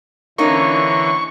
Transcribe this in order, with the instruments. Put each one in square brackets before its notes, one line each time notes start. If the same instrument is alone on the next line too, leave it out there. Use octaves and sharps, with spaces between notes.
[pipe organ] D3 E3 [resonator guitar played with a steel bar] A#3 C#4 D#4 [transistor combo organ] C#6